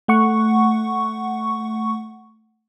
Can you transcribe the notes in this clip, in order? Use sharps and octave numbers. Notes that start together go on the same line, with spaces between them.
A3 F#5 C#6